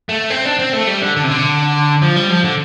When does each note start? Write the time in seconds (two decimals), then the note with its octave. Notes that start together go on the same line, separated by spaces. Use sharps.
0.09 A3
0.30 C4
0.45 D4
0.59 C4
0.73 A3
0.87 G3
1.02 D3
1.16 D3
1.24 C3
1.31 D3
2.02 F3
2.16 G3
2.30 F3
2.44 D3